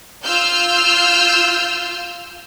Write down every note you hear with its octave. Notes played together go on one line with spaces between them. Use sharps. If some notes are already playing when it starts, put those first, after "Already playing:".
F4 E6 F6 G6